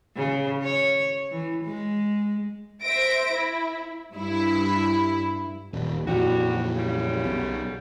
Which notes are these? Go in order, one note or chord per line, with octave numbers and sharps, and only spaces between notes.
C#3
C#5
E3
G#3
C5 E5 A#6 D7
E4
G2 E4
D#1
F2 A#2 E3 F#3 G3 F#4
F#2 C#3 G3
B1